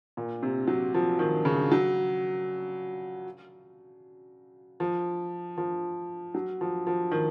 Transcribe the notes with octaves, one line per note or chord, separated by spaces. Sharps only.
A#2
C3
F#3
F3
D#3
C#3
F#3
F3
F3
F#3
F3
F3
D#3